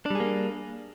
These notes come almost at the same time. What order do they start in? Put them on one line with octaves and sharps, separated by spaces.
D4 G3 G#4 A#3